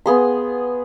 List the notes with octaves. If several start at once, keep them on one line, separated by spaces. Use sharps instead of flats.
B3 G#4 C6